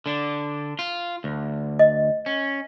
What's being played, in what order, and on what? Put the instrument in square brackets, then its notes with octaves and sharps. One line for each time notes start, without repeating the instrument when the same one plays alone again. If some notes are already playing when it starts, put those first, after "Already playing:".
[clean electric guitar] D3 D4
F4
D2
[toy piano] D#5
[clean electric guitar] C#4